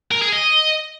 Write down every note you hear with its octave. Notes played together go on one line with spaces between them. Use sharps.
A#4
G#4
D#5